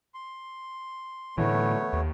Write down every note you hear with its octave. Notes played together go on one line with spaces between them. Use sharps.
C6
A2 D3 E3 A3 B3 C#5
D#2